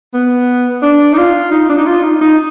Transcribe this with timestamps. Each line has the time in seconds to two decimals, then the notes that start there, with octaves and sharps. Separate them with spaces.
0.14 B3
0.82 D4
1.13 D#4
1.18 F4
1.51 D#4
1.69 D4
1.78 D#4
1.86 F4
2.04 D#4
2.21 D#4